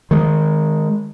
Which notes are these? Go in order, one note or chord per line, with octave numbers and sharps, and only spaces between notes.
D#3 G#3